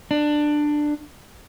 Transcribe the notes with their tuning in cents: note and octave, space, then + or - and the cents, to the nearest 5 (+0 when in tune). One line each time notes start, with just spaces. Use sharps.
D4 +15